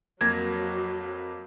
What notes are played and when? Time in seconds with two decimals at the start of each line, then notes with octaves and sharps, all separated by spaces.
0.21 F2 F#3 A#3 G#6 A#6